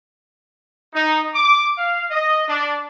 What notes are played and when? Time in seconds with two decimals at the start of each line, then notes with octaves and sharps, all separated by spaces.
0.94 D#4
1.35 D6
1.78 F5
2.11 D#5
2.48 D4